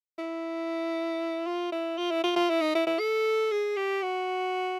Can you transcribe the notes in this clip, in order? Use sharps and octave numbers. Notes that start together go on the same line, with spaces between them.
E4
F4
E4
F4
E4
F4
F4
E4
D#4
E4
E4
A4
G#4
G4
F#4